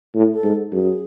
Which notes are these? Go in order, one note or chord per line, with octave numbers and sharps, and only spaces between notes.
A2
A4
G#2
F#2 G#4